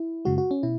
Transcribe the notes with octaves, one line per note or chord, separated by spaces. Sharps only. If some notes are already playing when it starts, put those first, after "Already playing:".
Already playing: E4
F#2 C#3 G#3 F#4
F#4
C#4
B2 E4